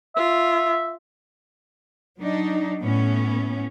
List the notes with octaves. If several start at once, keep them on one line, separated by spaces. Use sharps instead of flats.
F4 E5
F#3 D4 D#4
A2 B3 C#4